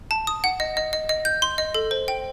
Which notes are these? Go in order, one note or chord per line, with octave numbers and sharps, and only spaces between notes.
A5
D#6
F#5
D#5
D#5
D#5
D#5
G6
C6
D#5
A4
C5
G5